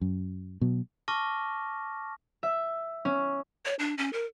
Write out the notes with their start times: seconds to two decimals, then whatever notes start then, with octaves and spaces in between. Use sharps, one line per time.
0.01 F#2
0.61 B2 F#3
1.08 A5 C#6 D6 F6 A#6
2.43 E5
3.05 C#4
3.65 C#5
3.79 D4
3.98 C#4
4.13 A#4